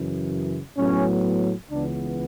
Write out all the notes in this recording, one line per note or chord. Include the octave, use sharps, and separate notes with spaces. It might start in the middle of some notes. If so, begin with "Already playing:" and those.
Already playing: F#2 C#3 E3
A2 F#3 B3 C#4
C#2 C#3 E3 B3 D4